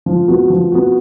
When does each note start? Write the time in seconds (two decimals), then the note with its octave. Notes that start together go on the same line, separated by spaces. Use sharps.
0.06 F3
0.28 B3 F#4
0.50 F3
0.72 B3 F#4